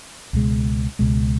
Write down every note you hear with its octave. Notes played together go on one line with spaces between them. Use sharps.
C#2 B2 G#3
C#2 B2 G#3